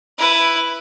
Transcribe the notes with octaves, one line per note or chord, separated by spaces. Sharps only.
E4 B4